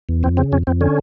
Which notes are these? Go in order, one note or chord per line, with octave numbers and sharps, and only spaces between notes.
E2
F2 C4
C#3 C4
F2 C#4
F2 C4
D3 C#4